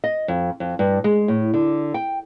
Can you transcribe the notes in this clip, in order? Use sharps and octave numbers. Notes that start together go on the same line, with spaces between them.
D#5
F2
F2
G2
G#3
A2
D3
G5